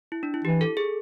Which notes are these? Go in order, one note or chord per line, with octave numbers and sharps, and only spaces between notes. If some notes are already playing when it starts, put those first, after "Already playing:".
E4
D4
E4
E3 G4
A4
G#4